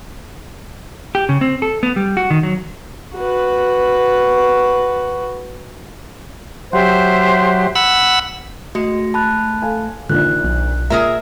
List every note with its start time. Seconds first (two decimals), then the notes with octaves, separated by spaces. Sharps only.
1.15 G4
1.29 C#3
1.41 C4
1.62 A4
1.83 B3
1.96 G3
2.17 F#4
2.30 D#3
2.43 F#3
3.16 F#4 B4
6.73 F#3 G4 C5 E5
7.75 F#5 B5 E6
8.75 G#3 A3 F#4 C#7
9.14 A5 B5 F#6
9.62 A4 F5 G#5
10.10 A#1 D#2 A#2 D3 F#6
10.44 B1
10.90 A#2 G#4 A#4 E5 A#5